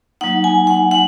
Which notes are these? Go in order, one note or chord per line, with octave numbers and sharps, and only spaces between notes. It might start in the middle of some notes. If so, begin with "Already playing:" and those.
F#3 A#3 D#4 F#5
G#5
F#5
F#5